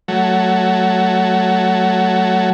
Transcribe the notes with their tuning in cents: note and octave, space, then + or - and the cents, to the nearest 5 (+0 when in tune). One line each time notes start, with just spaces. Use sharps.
F#3 +10 A3 +0